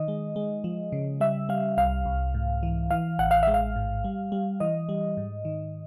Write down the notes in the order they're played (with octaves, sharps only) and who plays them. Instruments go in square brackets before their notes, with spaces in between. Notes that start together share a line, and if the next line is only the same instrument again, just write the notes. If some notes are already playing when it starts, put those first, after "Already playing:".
Already playing: [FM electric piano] D#3 D#5
G#3
G#3
F3
C#3
G3 E5
G3 F5
C2 F5
C2
G#2
E3
E3 F5
A1 F#5
F5
G#3 E5
F5
G#2
G3
G3
E3 D#5
G3
G#2
D#3